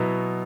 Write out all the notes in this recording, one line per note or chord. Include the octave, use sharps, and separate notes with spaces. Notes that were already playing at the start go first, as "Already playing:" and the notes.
Already playing: B2 F#3 B3 E4